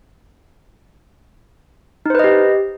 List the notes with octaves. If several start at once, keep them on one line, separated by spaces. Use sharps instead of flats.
D#4 G4 B4 C5 D#5